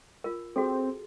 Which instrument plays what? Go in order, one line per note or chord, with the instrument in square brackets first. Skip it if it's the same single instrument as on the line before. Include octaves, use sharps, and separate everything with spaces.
[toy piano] F4 A#4
[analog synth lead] C4 [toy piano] F#4 G#4 A4